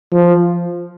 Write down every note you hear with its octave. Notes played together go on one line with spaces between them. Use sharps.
F3